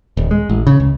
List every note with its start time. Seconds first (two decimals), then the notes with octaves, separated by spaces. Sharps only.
0.17 D#1
0.31 G#3
0.49 A1
0.67 C#3
0.80 C#2